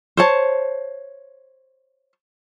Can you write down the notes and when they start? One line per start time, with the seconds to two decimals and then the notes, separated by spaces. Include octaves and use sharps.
0.17 C5 C#5 A5